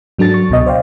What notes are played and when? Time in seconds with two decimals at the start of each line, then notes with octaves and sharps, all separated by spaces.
0.18 G#2 F#3 D4 A4 A6
0.34 C#6
0.50 C#2 B2 D#5
0.66 C5 D5 D#5 F5 G5